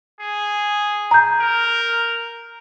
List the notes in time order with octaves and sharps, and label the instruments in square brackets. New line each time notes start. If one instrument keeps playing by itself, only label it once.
[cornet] G#4
[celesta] A#5 G6
[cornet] A#4